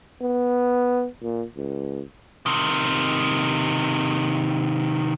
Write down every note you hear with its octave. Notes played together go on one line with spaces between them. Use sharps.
B3
A#2
C#2
C3 D#3